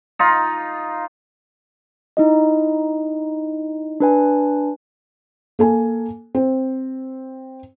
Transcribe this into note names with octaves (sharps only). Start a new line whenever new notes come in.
D#4 F4
D#4 E4 D#5
D4 B4 G#5
A#3 A4 G#5
C4